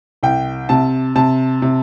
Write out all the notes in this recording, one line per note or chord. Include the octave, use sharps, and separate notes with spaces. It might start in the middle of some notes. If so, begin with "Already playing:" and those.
C2 G5
C3 A5
C3 A5
C3